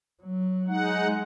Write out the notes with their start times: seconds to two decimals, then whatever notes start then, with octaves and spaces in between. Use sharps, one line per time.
0.23 F#3
0.67 G#3 D#4 F#5